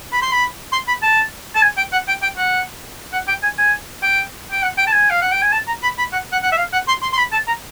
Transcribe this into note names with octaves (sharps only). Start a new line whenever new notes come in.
B5
C6
B5
C6
B5
A5
A5
G#5
G5
F#5
G5
G5
F#5
F#5
G5
G#5
G#5
G5
G5
F#5
G5
A5
G#5
F5
F#5
G5
G#5
A5
A#5
B5
B5
F#5
F#5
F#5
E5
F5
F#5
C6
C6
C6
B5
A5
A#5